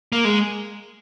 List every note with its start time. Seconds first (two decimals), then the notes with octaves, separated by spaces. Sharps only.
0.12 A#3
0.25 G#3